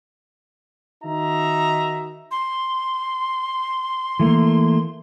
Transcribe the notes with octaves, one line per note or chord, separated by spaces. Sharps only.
D#3 D#4 F#4 E5 A#5
C6
E3 A3 A#3